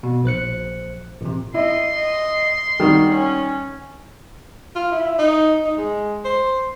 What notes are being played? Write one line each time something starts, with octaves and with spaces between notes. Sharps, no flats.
B2
A#1 C5 F#6 C#7
A1 C3
E4 D#5 C6
D#5
D#3 G3 F#4
C#4
F4
E4
D#4
D#4
G#3
C5